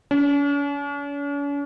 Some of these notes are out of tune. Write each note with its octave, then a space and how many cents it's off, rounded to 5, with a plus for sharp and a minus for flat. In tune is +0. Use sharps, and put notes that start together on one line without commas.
C#4 +45